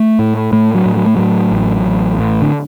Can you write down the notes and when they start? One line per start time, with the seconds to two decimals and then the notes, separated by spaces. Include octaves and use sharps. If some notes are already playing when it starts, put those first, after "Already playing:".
Already playing: A3
0.19 A2
0.52 A2 A3
0.75 F#3
0.86 A2
0.97 F#3
1.06 A3
1.16 A2 F#3
1.52 A1
1.86 A1
2.19 A2
2.42 D3